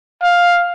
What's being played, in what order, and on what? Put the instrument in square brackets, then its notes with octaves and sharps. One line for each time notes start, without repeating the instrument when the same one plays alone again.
[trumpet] F5